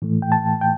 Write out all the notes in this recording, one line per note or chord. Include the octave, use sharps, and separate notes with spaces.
A2 E3 A3
G5
A5
G5